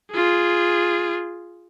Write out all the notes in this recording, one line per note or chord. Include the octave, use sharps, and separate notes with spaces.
F4 G#4